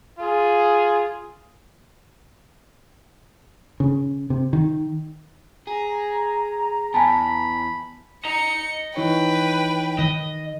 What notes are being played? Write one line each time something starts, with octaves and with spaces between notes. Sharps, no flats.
F4 G#4
C#3
C3
D#3
G#4 A#5
E2 G#5 A5 B5
D#5 A#5 C#7
E3 D#4 B4 C#5 G5
D#3 D#5